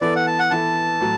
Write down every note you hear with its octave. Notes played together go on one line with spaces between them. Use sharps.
E3 B3 E4 A4 D5
F#5
A5
F#5
E3 B3 E4 A4 A5
A2 F#3